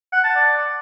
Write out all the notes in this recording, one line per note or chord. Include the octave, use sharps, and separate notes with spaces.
F#5
A5
D5